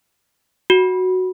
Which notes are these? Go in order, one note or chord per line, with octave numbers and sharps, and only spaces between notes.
F#4